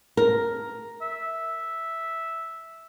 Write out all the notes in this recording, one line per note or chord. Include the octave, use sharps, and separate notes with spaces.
A#4
E5